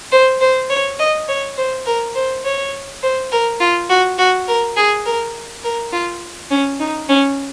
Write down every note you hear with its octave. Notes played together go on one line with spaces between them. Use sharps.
C5
C5
C#5
D#5
C#5
C5
A#4
C5
C#5
C5
A#4
F4
F#4
F#4
A#4
G#4
A#4
A#4
F4
C#4
D#4
C#4